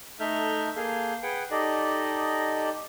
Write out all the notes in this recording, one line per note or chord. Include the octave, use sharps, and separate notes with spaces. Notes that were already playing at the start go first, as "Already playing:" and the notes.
A3 D#4 A4 E5 F6 G6
A#3 G#4 A4 F5 G6
G#4 B4 F#5 G5
D#4 G4 A4 D5 D#5